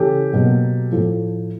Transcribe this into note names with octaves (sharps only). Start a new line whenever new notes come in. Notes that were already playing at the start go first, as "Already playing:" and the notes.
Already playing: C#3 E3 A3 C#4 G4 A4
B2 F#3 A#3
A2 F3 A3